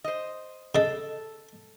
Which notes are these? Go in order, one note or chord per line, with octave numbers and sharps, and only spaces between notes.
C5 D#5
C#3 A4 D#5